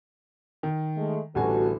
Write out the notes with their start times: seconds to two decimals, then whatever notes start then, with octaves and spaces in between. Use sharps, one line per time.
0.63 D#3
0.97 G#3 A3
1.35 A1 D2 G3 F#4 A4 G#5